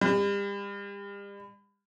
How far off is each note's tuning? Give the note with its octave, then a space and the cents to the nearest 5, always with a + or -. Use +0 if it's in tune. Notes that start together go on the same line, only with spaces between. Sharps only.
G3 +40